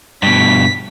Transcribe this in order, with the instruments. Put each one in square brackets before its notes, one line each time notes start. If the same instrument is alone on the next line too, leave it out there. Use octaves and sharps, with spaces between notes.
[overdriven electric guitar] G2 B2 [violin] B6